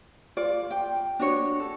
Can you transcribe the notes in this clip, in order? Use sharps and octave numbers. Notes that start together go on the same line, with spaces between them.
F4 D5
G5
D4 F#4 C#5
A4